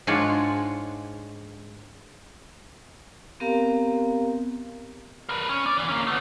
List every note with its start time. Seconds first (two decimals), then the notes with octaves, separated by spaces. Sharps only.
0.07 G#2 G#3 D4 F4 C#5 F#5
3.40 B3 C4 G4 A#4 F5 A#5
5.29 A#4 B4
5.49 C#4
5.66 D5
5.77 D2 E3
5.89 A#3 C#4
6.07 A3 B3